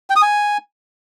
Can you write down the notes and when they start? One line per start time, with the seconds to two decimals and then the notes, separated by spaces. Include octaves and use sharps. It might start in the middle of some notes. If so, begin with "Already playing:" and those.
0.10 G5
0.16 D#6
0.22 G#5